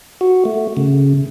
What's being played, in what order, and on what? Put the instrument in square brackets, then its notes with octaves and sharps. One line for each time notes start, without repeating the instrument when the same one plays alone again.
[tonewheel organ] F#4
A3
C#3